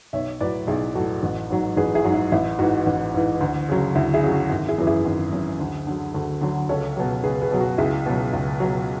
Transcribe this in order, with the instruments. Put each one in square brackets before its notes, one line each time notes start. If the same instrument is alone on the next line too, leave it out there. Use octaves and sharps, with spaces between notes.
[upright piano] B1 C#5 E5
A2 F#3 B4 D5
B1 E4 G#4
A2 F#3 F#4 A4
A1
G#2 F#3
A1 G#4 B4
E4 G#4
G#2 F#3
E4
A1 E4
G#2 E3 F#4
A1
G#2 E3
D2
C#3 F#3
D2 E4
E4 G#4
C#3 F#3
F#4
G#1
E4 G#4
F#2 E3
E4 G#4
G#1
F#2 E3
D2
D3 F#3
D2 F#4 A4
D3 F#3
C#2 A4 C#5
B2 F#3
C#2 G#4 B4
G#4 B4
B2 F#3
F#4
C#2 E4 G#4
B2 F#3
C#2
B2 F#3